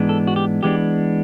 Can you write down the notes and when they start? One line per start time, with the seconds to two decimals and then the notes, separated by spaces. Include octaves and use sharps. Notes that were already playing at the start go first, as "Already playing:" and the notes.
Already playing: G#2 E3 G#3 B3 D4
0.09 A4
0.27 F#4
0.36 G4
0.63 E3 G#3 B3 D4 G4